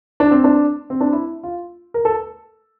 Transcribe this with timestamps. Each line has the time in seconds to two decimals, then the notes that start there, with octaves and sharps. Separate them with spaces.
0.20 D4
0.31 C4
0.44 D4
0.90 C4
1.01 D4
1.13 E4
1.43 F4
1.94 A#4
2.05 A4